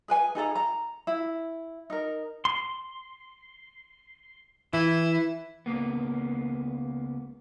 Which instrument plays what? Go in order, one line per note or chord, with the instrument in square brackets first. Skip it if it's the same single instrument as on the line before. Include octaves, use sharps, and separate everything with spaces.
[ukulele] G#4 B4 G#5
D#4 G#4 A4 A#5
A#5
E4
D#4 A#4
[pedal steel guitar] C6
[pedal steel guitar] E3 [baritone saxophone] E4
[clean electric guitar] C#2 A#3 B3